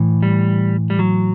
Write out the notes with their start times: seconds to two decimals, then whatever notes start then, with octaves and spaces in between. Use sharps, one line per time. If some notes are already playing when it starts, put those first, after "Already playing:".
Already playing: A2 E3
0.23 G3
0.90 G3
0.99 F#3